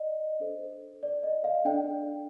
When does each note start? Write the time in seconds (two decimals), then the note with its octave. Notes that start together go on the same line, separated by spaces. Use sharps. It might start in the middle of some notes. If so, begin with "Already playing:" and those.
Already playing: D5 D#5
0.40 D4 A4 C5
1.03 D5
1.23 D#5
1.44 F5
1.65 D4 A4 D5 G5